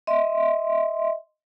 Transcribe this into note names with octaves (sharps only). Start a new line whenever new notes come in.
D#5 E5 C6